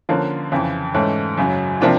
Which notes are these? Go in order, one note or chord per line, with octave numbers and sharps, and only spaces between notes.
D3 F3 A#3 C#4
F2 C#3 E3
G#2 E3 A3 C#4
F#2 C#3 F#3
C3 F3 A#3 D4 F4